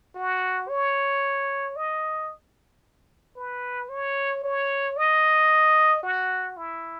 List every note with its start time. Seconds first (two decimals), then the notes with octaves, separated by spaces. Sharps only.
0.15 F#4
0.69 C#5
1.76 D#5
3.36 B4
3.89 C#5
4.44 C#5
4.97 D#5
6.03 F#4
6.57 E4